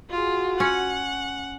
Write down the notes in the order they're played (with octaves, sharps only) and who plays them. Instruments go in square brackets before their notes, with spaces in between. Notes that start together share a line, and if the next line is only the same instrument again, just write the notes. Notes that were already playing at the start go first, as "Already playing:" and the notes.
[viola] F4 G#4 [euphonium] F#4
[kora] C#4 [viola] F#5